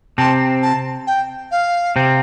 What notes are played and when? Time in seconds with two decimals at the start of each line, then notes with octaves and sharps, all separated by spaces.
0.18 C3 C4 A5
0.62 A5
1.07 G5
1.51 F5
1.96 C3 C4